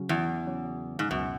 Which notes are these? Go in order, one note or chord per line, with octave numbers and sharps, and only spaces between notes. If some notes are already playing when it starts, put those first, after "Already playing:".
Already playing: C#3 F#3 C#4
E2
C#3 F#3 C#4
G#2
C#2 F#2 B2 F#3